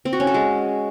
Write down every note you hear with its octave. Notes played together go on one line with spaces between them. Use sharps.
C4
F#4
C#4
A4
G#3